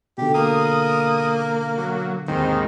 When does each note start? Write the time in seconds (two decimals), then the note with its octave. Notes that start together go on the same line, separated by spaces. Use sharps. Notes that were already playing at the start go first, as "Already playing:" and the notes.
0.18 B2 D3 G4
0.34 A#3 D#6
1.78 F#3
2.28 D#2 G#2 D#3 C4